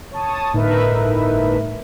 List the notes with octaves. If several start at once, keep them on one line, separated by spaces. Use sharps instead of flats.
C#5 A5 D#6
G1 A2 D#4 A#4 B4 E5